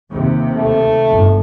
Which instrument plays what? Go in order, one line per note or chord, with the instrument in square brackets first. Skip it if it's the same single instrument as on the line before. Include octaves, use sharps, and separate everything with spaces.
[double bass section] D#2 C3
[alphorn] A3
[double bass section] G1